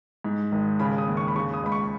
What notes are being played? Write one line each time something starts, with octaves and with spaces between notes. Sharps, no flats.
G#2
G#1
C#3 B5
D#6
D#2
C#6
B5
C#3 C#6
D#6
C#2 B5
C#6